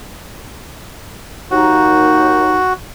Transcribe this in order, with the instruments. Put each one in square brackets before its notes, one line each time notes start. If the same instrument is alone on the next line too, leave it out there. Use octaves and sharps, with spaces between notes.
[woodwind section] D#2 D#4 [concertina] F#4